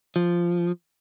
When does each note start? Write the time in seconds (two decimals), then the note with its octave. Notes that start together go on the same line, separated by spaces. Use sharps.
0.16 F3